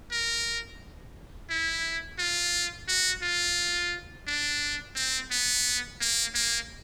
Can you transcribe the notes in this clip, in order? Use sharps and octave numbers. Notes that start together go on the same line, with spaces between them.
A#4
E4
F4
F#4
F4
D4
C4
B3
A#3
A#3